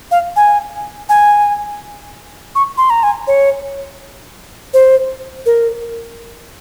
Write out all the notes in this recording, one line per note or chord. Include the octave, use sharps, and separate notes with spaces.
F5
G#5
G#5
C#6
C6
A#5
G#5
C#5
C5
A#4